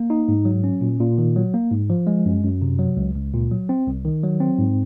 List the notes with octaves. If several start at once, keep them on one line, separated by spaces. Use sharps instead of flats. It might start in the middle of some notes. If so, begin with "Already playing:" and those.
Already playing: A#3
D#4
G#2
F#3
C#4
A#2
A#2
D#3
F#3
A#3
G#2
F3
G#3
F#2
F#2
C3
F#3
C#2
C#2
A#2
F#3
C4
C2
D#3
F#3
C4
G#2